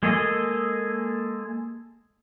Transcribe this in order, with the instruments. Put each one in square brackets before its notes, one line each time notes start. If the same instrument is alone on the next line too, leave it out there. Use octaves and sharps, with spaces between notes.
[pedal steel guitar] G#3 A#3 G#4 A4 D#5